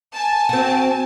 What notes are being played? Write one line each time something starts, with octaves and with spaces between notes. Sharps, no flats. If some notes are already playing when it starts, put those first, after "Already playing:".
G#5 A5
C4 F#4